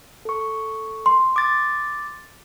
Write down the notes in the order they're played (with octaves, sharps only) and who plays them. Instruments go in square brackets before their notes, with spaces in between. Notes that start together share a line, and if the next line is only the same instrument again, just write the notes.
[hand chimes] A4 C#6
[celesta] C6
[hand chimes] D6 A6